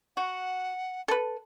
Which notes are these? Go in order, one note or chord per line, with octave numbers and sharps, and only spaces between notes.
F#4 F#5
A4 B4